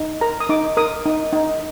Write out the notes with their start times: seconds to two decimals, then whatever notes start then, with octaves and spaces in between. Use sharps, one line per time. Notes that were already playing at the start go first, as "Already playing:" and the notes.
Already playing: D#4
0.21 A#4 A#5
0.40 D#6
0.49 D#4 D6
0.77 A#4 D#6
1.06 D#4
1.33 D#4